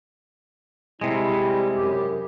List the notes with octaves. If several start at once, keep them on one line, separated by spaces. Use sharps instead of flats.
C3 G3 G#3 E4
F#2 G4